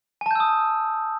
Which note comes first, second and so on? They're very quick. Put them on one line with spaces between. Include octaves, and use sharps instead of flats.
G#5 A5 G6 E6 D#6